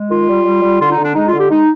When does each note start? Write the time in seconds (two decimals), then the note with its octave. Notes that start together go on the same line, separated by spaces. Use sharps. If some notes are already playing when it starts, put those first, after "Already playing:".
Already playing: G#3
0.10 D#3 F4
0.29 G3
0.45 G3
0.62 G3
0.81 D3 F4
0.92 D#4
0.98 D3
1.04 D4
1.15 G#3 D#4
1.28 F4
1.33 D3
1.39 G4
1.51 G#3 D#4